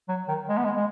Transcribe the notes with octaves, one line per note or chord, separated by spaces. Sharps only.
F#3
D#3
G#3
B3
G#3
G#3